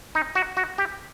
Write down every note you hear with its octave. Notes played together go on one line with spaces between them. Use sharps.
D#4
F#4
F#4
G4